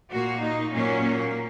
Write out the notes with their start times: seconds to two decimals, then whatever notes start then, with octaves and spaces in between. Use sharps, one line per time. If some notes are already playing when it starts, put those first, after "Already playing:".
0.11 A#2 A#3 F#4
0.43 D#4
0.74 A#2 F#3 A#3 C#4
1.05 A#3